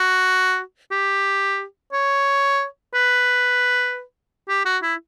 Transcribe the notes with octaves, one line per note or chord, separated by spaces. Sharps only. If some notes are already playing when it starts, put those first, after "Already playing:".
Already playing: F#4
G4
C#5
B4
G4
F#4
E4